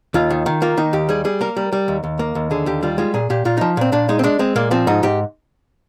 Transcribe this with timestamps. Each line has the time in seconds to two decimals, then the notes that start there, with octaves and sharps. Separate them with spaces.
0.14 D#2 F4
0.30 D#3
0.46 D#3
0.62 A#3 F4
0.77 D#3 D#4
0.93 D#2 G4
1.09 G3 G#4
1.25 G3 G#4
1.41 A#3 A#4
1.57 G3
1.73 G3
1.88 D#2
2.04 D#2
2.19 A#3
2.35 D#2
2.51 D3 G#4
2.66 D#2 G4
2.83 G3 F4
2.98 G#3 F4
3.14 A#2 G#4
3.30 A#2 G4
3.45 A#2 F4
3.57 F3 D#4
3.77 A#2 C4
3.92 A#2 D4
4.09 G#3 D#4
4.19 C4
4.24 G#3 D4
4.39 G#3 C4
4.56 A#2 A#3
4.71 F3 C4
4.87 G#2 D#4
5.03 G#2 G4